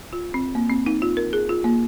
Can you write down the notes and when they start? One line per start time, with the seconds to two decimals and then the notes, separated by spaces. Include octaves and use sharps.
0.13 F4
0.34 C4
0.55 A#3
0.70 C4
0.86 D#4
1.02 F4
1.17 A#4
1.33 G#4
1.49 F4
1.64 A#3